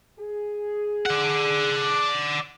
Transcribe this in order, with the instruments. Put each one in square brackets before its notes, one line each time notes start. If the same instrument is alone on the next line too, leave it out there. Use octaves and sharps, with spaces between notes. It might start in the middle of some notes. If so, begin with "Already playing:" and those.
[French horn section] G#4
[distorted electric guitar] D5 F#5